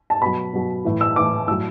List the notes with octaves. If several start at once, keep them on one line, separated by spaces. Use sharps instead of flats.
A5
B2 F#3 B5
B2 F#3
A2 E3
E6
A2 E3 D6
A2 F#3 E6